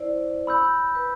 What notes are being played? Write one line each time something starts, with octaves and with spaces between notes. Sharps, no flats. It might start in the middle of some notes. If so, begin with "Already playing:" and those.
Already playing: E4 C5 D5
B5 E6 G6
B4